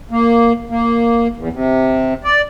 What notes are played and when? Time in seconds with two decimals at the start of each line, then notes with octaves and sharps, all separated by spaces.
0.11 A#3
0.70 A#3
1.37 E2
1.53 C3
2.24 D5